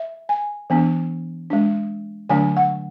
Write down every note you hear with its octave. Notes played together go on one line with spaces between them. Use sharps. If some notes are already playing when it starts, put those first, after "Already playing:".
Already playing: E5
G#5
E3 B3 D4
G#3 D4
D3 F#3 A3 D4 G#5
F#5